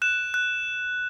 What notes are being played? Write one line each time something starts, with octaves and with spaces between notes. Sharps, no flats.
F#6 E7
F#6